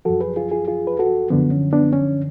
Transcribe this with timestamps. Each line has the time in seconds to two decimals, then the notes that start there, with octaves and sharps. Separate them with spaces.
0.05 F#2 F3 F#4 A4
0.20 G#4 B4
0.36 F4 G#4
0.51 F4 G#4
0.68 F4 G#4
0.87 B4
0.99 F#4 A4
1.30 F#2 D3 F3 B3
1.51 C#4
1.73 B3 D4
1.93 C#4